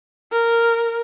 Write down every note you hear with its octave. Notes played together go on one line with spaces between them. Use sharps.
A#4